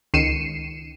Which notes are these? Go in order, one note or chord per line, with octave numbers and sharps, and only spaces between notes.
C#2 D#3 C7 C#7 D#7 E7